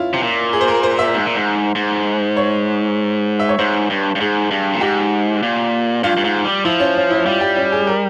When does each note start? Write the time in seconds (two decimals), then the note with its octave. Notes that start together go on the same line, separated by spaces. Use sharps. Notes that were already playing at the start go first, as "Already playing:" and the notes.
Already playing: C#4 E4 F4
0.14 C3
0.23 A#2
0.53 G#4
0.61 C5
0.68 A#4
0.83 C5
0.99 E5
1.14 G#2
1.26 A#2
1.36 G#2
1.75 G#2
2.37 C#5
3.39 E5
3.49 C#5
3.58 G#2 C5
3.90 G2
4.15 G2
4.20 G#2 G#4
4.51 G2
4.73 A#2
4.81 G#2 G4
5.43 A#2
6.03 G2 F4
6.17 G2
6.24 G#2
6.45 G3
6.65 F3 E4
6.80 C#4
6.96 C#4
7.10 E4
7.26 G3 F4
7.41 G4
7.56 C#4
7.72 G#4
7.87 A#4